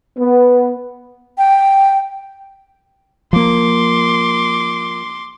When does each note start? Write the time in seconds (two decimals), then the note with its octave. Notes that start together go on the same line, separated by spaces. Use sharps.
0.18 B3
1.38 G5
3.33 F3 A#3 C6 D6